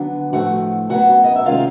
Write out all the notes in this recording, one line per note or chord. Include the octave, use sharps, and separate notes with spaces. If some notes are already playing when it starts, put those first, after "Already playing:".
Already playing: D3 F#3 B3 D4
A2 F3 A3 F#4 F#5
C#3 F#3 B3 F#4 F#5
D#5
E5
C3 D#3 G#3 C#4 F4 F5